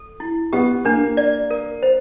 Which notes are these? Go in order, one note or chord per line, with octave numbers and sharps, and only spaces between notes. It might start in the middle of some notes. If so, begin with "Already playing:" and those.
Already playing: A4
E4
B3 G4
A#3 D4
D5
A#4
C5